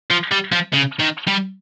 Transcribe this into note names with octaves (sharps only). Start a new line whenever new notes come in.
F3
G3
F3
C#3
D#3
G3